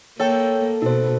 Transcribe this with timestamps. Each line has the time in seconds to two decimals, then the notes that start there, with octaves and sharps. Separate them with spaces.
0.20 A#3 A4 C#5 G5
0.82 B2 D#4 C5